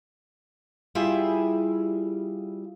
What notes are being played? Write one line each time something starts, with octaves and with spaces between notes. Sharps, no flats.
G3 E4 F4 G#4 E5